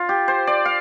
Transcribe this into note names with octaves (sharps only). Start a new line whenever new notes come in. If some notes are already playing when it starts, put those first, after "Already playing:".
Already playing: F4
G4
C5
D5
F5